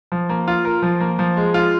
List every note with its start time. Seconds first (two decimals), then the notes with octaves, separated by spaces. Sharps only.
0.12 F3
0.29 A#3
0.48 F4
0.65 A#4
0.82 F3
1.00 A#3
1.19 F3
1.37 G#3
1.54 F4